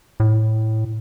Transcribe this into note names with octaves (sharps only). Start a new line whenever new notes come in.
A2